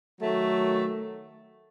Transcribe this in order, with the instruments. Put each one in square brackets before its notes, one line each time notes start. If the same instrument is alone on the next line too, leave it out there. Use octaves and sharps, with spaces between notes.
[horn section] D#3 F#3 A3